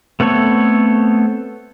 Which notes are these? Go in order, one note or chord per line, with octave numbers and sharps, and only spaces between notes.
A3 B3 C4 A4 C#5